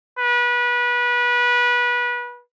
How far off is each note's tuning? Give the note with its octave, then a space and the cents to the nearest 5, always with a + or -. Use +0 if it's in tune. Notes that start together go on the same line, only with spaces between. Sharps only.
B4 -25